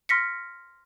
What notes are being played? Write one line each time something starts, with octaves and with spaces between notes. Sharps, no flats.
C6 F6 A#6 B6 C#7